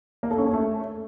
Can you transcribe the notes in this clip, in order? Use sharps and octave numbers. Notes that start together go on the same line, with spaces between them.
A#3
A4
C#4
C#5
A3